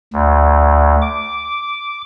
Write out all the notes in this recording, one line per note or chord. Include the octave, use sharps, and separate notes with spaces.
D2
D6